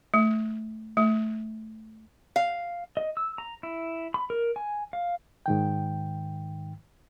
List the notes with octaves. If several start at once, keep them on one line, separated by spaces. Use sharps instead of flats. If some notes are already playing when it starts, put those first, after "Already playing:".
A3
A3
F5
D#5
E6
A#5
E4
B5
A#4
G#5
F5
G#2 D#3 G5